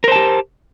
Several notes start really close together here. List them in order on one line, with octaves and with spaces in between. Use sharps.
A#4 C5 A5 G4